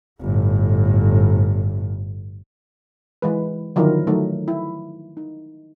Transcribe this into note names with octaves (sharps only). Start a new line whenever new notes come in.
G1 A2
E3 G#3 B4
D3 D#3 F3 F#3 E4 A#4
F#3 A3 D#4
E4
D#4